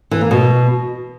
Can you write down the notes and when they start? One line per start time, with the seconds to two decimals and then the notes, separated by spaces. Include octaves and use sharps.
0.11 E3
0.21 A#3
0.31 B2